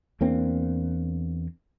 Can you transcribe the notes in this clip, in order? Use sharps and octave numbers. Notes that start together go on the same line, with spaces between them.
E2 A#3 C4 D4